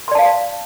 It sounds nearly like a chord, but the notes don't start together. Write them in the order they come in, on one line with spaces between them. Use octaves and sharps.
C6 D5 A5 F5